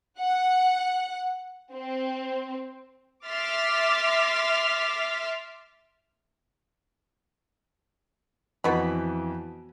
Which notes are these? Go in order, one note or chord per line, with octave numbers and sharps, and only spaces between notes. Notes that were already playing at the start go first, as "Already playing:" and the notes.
F#5
C4
E5 C6 D6 F6 A6 B6
F2 B2 E3 B5